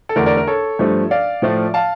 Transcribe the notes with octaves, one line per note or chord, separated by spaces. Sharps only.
A4
E2 D3 A3 D4 A#4
A#4 D5
A#4
A4 C#5
G2 F3 A3
D5 F5
A2 F3 A3
F5 A5